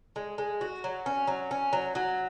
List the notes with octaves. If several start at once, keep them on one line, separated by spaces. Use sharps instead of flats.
G#3
G#3
F#4
F#3
C#4
F#3
C#4
F#3
F#3